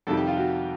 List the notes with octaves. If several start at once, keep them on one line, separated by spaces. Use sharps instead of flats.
F2 C3 D#3 G3 A4
G4
F4
F#4